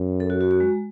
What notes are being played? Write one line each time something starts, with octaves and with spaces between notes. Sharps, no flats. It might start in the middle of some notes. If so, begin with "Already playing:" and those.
Already playing: F#2
A4
F#4
F#4
F#4
G#3